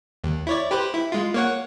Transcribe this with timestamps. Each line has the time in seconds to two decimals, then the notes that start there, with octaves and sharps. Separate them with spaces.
0.24 D#2
0.47 E4 C#5 D5
0.71 G4 B4 C5
0.94 E4
1.12 G#3 F4
1.34 A#3 C#5 F#5